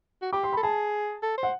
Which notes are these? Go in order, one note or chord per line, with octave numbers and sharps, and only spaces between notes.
F#4
G4 D6
C6
B5
A4
G#4 A5
A4
C5
F#5